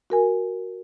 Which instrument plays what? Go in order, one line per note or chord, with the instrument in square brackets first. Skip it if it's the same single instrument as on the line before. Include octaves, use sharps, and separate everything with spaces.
[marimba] F#4 A#4 G#5